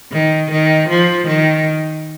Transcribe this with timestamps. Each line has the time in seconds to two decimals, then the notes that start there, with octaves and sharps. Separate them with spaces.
0.12 D#3
0.51 D#3
0.89 F3
1.27 D#3